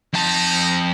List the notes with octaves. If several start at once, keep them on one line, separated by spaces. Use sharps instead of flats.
F2 D#4 A5